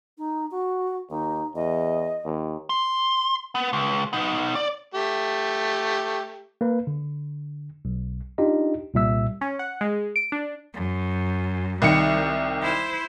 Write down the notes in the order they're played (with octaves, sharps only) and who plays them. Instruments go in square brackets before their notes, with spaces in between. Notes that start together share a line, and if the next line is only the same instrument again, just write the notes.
[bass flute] D#4
F#4
[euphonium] D#2 [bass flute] D#4
[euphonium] E2 [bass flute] D#5
[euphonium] D#2
[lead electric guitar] C6
B3
C#2
B3 D#4
D5
[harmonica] A3 G4
[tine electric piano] A#3 B4
D3
B1
D4 D#4 F4 G4 D#5
C2 A#2 G3 E5 E6
[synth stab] C#4
F#5
G#3
D7
D4
[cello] F#2
[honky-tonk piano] C2 D#3 C#7 [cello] G3
[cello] E4 C5